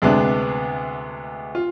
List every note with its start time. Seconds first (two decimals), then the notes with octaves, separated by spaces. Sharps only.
0.02 D2 C3 G#3 B3 D4
1.55 F4